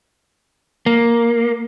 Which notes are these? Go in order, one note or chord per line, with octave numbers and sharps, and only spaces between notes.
A#3